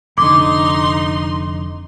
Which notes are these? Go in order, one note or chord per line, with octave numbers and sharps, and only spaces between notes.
F1 D3 D#4 C6 D6